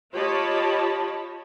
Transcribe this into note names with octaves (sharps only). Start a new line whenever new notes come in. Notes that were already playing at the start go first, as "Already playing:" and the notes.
F4 G4 C#5 D#5 A5 B5